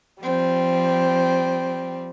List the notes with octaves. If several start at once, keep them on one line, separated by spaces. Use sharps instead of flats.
F3 G3 C4